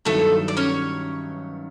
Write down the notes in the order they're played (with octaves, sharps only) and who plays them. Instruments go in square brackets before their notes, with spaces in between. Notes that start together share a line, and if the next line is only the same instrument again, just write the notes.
[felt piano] G2 D#3 F#3 B3 E4 [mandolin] A3 A4
[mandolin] D5
C#4 C#5